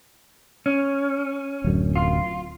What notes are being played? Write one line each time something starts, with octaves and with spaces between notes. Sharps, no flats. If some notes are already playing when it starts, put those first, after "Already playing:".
C#4
D1 F#2
F4